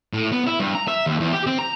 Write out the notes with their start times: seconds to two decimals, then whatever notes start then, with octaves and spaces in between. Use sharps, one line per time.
0.13 A2
0.32 B3
0.47 E4
0.60 G2
0.75 A#5
0.88 E5
1.06 D#2
1.20 E2
1.33 G4
1.46 C4
1.59 A#5